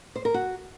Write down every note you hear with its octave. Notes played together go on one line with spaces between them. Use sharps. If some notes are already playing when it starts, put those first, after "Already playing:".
C5
A#4
F#4